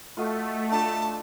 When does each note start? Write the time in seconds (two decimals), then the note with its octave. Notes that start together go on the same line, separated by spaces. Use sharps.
0.17 A3 F4 F#4 D#5
0.72 D4 F4 A5